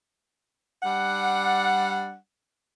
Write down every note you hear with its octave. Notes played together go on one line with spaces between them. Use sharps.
G3 D4 F#5